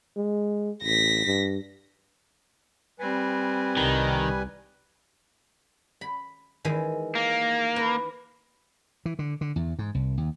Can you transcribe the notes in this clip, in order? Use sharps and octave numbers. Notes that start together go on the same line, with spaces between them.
G#3
A1 A#6 B6
G2
G3 C4 B4 G#5
C2 D#3
B5
D#3 E3 G#3
A#3
B4
E3
D3
D3
E2
G#2
C2
D#2